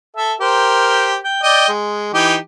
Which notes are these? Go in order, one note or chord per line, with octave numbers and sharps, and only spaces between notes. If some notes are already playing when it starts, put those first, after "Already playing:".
A4 E5
G4 A#4 C5
G5
D5 D#5 G5
G#3
E3 D#4 G4